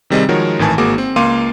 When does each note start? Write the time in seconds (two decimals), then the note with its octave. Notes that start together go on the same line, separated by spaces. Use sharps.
0.10 C3 D#3 G3 C4 G#4 D#5
0.29 D#3 F3 G#3 F#4 A#4 C#5
0.59 G#1 A2 D#3 E3 G#5 A5
0.78 G#1 A#3 F#4 G#4 D6
0.98 C4
1.16 C#2 A#3 F5 C6 D6 D#7